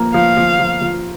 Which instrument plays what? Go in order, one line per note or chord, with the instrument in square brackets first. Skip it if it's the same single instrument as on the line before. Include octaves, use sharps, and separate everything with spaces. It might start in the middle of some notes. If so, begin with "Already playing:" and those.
Already playing: [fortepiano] F3 A#3
[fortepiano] F3 [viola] F5
[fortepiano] F3
F3
F3